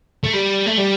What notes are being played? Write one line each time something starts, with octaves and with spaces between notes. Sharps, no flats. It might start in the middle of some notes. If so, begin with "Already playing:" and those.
A3
G3
A3
G3